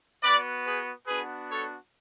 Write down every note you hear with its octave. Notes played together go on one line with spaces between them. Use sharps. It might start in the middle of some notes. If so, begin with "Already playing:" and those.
B3 F#4 B4 D5
G#4 B4
B3 D4 F#4 G#4 B4
A4 C#5